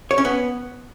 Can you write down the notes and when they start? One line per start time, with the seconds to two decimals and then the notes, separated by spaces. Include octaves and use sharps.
0.11 C#5
0.18 C#4
0.25 B3